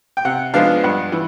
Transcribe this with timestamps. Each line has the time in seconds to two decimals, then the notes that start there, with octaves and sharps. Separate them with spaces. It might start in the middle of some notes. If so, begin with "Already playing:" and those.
0.17 G5
0.25 C3 F#5
0.54 F3 G#3 B3 D4 F5
0.84 G2 F#5
1.12 E3